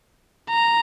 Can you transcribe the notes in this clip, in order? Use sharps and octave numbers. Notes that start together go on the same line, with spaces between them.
A#5